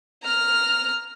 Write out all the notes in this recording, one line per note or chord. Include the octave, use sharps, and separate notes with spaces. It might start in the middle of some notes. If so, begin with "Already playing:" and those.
A#5 F6